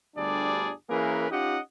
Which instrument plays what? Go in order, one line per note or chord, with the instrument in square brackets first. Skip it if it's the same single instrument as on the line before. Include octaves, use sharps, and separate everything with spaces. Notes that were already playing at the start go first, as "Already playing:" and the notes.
[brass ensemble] G1 D2 G3 D4 G#4 D5
E3 A#3 C#4 G#4 A#4 B4
C#4 D#4 F4 G4 D#5 F#5